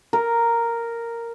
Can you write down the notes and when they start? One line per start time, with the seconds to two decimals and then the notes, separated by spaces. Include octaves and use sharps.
0.13 A#4